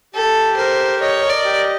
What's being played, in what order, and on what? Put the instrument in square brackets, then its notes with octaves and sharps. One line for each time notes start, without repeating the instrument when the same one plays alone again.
[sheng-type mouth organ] G4 [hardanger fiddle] A4
[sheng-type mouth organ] A#4 [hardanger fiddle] C5
[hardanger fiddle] C#5 [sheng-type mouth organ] D#5
[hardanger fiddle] D5
[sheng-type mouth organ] G4